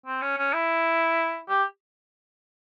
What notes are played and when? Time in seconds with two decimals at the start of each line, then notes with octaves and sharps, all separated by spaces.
0.06 C4
0.22 C#4
0.38 C#4
0.54 E4
1.49 G4